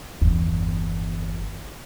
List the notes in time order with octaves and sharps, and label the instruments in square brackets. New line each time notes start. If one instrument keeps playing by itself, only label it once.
[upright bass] G1 E2